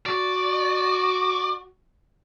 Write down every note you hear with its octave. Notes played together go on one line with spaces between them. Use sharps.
F#4 D5